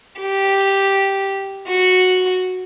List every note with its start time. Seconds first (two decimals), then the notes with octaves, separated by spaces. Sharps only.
0.21 G4
1.69 F#4